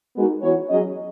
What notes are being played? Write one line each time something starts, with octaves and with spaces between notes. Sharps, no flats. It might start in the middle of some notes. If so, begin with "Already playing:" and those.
G#3 B3 D#4 F#4 A#4
E3 B3 F#4 C#5
F#3 C#4 G#4 D#5